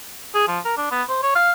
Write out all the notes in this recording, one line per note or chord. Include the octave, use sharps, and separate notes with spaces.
G#4
F3
A#4
D4
B3
C5
C#5
F5